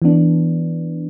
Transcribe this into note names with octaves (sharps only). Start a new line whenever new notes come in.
E3 B3 D4